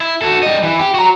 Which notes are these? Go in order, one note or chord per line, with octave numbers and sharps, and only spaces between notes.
E4
F#4 A4
G3 D#5
E3
G4
F#4 A#5